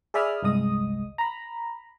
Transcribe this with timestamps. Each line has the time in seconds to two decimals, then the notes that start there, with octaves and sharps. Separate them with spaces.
0.14 G#4 D5 E5 B5 D#6 F6
0.42 G1 C2 G#3 D#5 D#6
1.18 A#5 B5